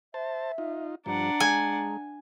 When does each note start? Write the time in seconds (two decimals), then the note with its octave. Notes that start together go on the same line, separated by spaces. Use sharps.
0.14 C5 E5 A5
0.58 D#4 F4
1.06 G2 F3 D4 F#5 A#5
1.40 G#3 G#5